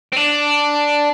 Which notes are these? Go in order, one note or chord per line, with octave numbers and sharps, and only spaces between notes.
C4
D4